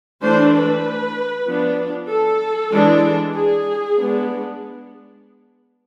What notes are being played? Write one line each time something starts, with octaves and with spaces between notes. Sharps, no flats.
E3 A3 D4 C5
B4
F3 B3 D4
A4
E3 G#3 D4
G#4
G#3 B3 D4